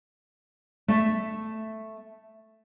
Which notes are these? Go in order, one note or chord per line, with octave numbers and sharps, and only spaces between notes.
A3 E5